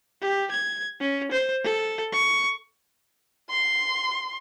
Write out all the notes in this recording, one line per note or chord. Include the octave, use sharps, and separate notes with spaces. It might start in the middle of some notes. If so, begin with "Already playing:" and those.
G4
G#6
C#4
C5
A4
C#6
C6